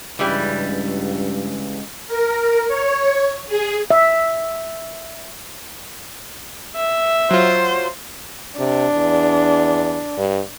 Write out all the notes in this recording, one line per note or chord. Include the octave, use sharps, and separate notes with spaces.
C#2 G2 C#3 E3 G3
A#4
C#5
G#4
E5
E5
F#3 F4 C5
C3 D4
E2
G2